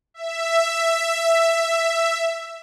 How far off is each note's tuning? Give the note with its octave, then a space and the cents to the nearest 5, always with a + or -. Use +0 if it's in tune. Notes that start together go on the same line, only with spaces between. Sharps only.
E5 +10